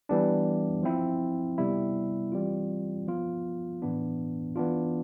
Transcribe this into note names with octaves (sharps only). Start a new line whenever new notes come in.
E3 G3 B3 D4
F3 C4 E4
C3 G3 B3 E4
E3 G3 C4 F4
F3 B3 F4
A2 E3 B3 D4
E3 B3 D4 F4